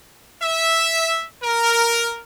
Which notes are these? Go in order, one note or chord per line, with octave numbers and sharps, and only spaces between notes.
E5
A#4